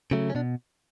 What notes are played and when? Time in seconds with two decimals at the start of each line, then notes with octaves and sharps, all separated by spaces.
0.11 C#3 F#3 A3
0.30 C#4
0.35 B2 D4